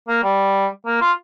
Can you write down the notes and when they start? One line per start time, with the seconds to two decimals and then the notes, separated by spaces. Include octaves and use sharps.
0.08 A#3
0.24 G3
0.86 A#3
1.01 F4